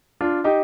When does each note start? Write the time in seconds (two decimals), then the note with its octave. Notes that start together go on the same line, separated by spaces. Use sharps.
0.21 D4 F4
0.44 D#4 G4